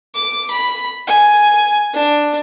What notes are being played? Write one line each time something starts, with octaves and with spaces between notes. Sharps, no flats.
D6
B5
G#5
D4